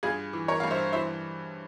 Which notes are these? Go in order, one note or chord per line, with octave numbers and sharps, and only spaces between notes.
G2 F4 G#4
E3
A#4 C#5
G2 F5
C5 E5
E3 C5 E5